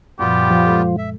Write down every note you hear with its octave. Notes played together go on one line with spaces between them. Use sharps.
F#2 A#2 F3 G3 B3 F4 G4
F3
G#3 A4
E5